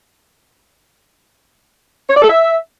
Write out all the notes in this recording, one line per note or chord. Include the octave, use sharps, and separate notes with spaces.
C#5
D5
A4
E5